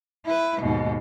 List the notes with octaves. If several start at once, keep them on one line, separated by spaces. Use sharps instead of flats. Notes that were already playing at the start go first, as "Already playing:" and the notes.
E4 B4
D#2 G#2 B2